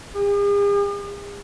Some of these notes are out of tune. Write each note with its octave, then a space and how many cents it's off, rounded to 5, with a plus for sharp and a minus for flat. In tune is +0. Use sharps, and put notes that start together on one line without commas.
G#4 -45